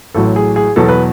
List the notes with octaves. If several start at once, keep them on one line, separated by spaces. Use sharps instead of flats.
A1 A2 F#3 A4
G#4
G#4
E2 B2 F#3 A4
B4